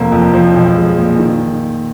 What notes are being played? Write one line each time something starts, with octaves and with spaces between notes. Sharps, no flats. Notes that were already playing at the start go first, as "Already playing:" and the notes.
Already playing: F1 F3 A#3
F2
F3
B1
G#3
A#2
D#3